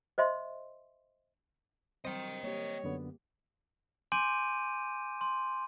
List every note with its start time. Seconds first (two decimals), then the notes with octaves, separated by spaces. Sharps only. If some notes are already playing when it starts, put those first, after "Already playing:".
0.18 C5 D#5 E5 C6
2.05 F#3 G3 C4 C5 D#5 G5
2.43 A#3 G4 C#5
2.84 F#2 D3 B3
4.12 G#5 C6 D6 G6 D7 D#7
5.21 C6